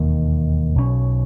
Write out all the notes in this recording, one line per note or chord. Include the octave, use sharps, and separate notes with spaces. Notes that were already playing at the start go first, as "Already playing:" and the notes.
Already playing: E1 D#2 D#3
B1 B2 F#3 C#4